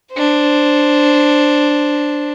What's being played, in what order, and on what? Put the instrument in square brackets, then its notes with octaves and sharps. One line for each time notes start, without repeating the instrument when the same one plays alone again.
[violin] D4 C5